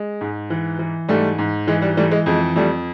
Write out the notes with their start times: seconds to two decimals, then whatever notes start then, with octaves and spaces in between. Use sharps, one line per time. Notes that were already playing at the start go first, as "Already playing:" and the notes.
Already playing: G#3
0.21 G#2
0.50 E3
0.79 E3
1.08 G#2 G3 A3
1.38 G#2
1.67 E3 G#3
1.82 G3
1.97 E3 G3 A3
2.11 G#3
2.26 F2 G#3
2.56 F2 G3 A3